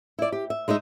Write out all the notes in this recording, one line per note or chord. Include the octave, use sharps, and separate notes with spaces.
E4 D5
G4
E5
G#3 D#4 D#5 E5